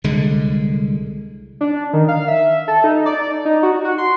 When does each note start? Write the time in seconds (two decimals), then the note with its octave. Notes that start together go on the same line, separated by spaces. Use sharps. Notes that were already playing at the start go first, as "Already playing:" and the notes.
0.04 C2 D3 G#3
1.61 D4
1.93 D#3
2.08 F5
2.28 E5
2.68 A4
2.84 D#4
3.06 D5
3.45 D#4
3.63 F#4
3.84 F#4
3.98 C6